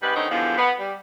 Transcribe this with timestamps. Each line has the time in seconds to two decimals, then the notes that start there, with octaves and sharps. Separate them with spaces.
0.02 G#2 C3 G3 G#3 B4
0.15 D3 D#3 A3 C4 C#4 D#4
0.31 E2 G2 D3 F3
0.58 B3
0.80 G3